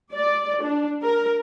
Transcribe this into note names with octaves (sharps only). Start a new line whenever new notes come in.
D5
D4
A#4